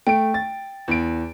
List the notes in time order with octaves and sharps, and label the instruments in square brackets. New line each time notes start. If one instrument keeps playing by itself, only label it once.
[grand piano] A3 D7 [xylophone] G5
[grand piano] A6
E2 D7